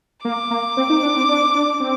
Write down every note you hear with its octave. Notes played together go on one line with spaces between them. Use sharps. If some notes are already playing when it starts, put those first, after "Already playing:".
A#3 D6
A#3
C4
D#4
D4
C4
D4
D4
C4